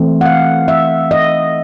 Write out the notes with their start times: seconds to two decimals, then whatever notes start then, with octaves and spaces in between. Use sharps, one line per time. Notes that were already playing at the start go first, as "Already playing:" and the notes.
Already playing: E3 A3 C4
0.21 F#5
0.25 F5
0.68 E5
1.11 D#5